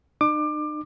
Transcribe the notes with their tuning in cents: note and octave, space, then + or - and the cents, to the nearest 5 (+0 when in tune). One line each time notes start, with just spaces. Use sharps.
D#4 -45 D6 +25